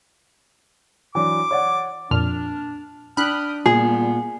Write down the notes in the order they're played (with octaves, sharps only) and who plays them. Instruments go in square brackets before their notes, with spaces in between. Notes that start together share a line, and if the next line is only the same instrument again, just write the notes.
[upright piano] E3 F#3 D4 [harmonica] D6
[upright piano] C#5 D5 F#5
[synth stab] F2 A#2 F6 [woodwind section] D4
[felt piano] D4 [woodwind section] G5 D#6 F6 [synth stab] B5 F#6
[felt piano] A#2 [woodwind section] G3 B3 [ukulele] G#4